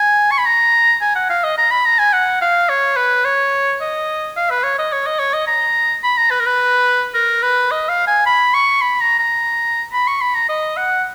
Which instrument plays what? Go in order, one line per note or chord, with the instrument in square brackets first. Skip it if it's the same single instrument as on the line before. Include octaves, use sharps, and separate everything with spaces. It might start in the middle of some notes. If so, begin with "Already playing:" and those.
Already playing: [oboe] G#5
C#6
B5
A#5
G#5
F#5
F5
D#5
A#5
B5
A#5
G#5
F#5
F5
C#5
B4
C#5
D#5
F5
B4
C#5
D#5
C#5
D#5
C#5
D#5
A#5
B5
A#5
B4
A#4
B4
A#4
B4
D#5
F5
G#5
B5
C#6
B5
A#5
A#5
B5
C#6
B5
A#5
D#5
F#5